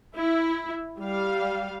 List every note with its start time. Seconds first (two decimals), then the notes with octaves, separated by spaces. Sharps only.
0.17 E4
1.01 G3 F5